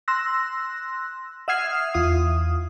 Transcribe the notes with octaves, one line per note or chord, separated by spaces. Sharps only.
C6 E6 F#6 A#6
E5 F#5 D#6 F6 G#6 C7
E2 F4 D#6